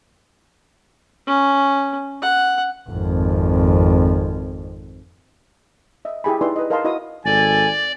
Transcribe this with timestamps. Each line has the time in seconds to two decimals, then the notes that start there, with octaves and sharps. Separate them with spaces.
1.27 C#4
2.22 F#5
2.89 G#1 F2
6.05 D#5 E5
6.24 E4 G4 G#4 G#5 B5
6.41 D#4 E4 B4 D5 C6
6.56 B4 D#5
6.70 A#4 D#5 F5 A5 A#5 C6
6.85 E4 F#4 D#5 B5 D#6
7.26 G#1 A4 D5 G#5